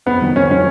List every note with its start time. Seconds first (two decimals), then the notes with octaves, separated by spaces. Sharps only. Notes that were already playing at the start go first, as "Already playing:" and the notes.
0.06 F2 B3
0.22 D#3 F#3
0.36 F2 C#4
0.50 D#3 F#3 C#4